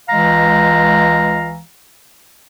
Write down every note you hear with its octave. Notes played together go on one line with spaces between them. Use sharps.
C#2 E3 G#3 F5 A#5